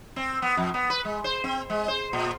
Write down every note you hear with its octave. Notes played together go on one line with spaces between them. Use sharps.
C4
B3
F2
B3
B4
G#3
C5
C4
G#3
C5
A#2